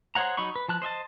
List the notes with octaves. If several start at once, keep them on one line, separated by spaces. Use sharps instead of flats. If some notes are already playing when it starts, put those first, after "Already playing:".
G#4 C5 C#5 F#5 A#5
F#3 D#4 B5 C#6
B4
F3 A5 F#6
C5 D#5 E5 A5